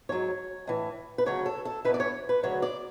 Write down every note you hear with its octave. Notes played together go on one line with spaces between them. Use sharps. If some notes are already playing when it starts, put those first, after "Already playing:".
G#2 F#3 C#5
A2 E3
B4
D2 C#3 F#3 C#5
A4
A4
E2 C#3 E3 B4
D5
C#5
B4
D2 C#3 F#3 C#5
D5